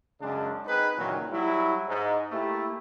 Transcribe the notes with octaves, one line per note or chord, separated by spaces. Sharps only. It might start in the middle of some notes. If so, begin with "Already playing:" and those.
F#2 C#3 G#3 D4
C4 D#4 G#4 B4
C#2 A#2 D#3 E3 F#3
F#3 G3 E4
G#2
A3 A#3 E4 G4